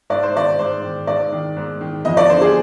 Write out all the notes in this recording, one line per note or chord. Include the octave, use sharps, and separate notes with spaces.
G#2 D5
C5
D#3 D5
G#2 C5
D#3
G#2 D5
D#3
G#2
D#3
F2 D#5
D5
D3 C5
G#4